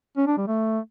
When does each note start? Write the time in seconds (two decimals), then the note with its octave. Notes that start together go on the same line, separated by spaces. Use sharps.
0.17 C#4
0.27 D4
0.37 G3
0.47 A3